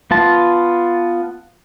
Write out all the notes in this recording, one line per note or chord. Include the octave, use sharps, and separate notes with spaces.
B3 F4 A5